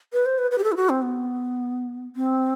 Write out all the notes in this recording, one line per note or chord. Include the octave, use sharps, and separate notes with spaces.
B4
C5
B4
B4
G4
A4
E4
F#4
C4
B3
C4